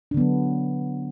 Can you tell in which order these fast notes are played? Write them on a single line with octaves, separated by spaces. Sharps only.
D4 D3 B3 F#3